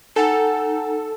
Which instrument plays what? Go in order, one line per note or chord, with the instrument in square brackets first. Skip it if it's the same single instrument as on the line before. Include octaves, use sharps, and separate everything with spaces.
[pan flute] D#4 [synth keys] A4 [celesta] F#5 G#5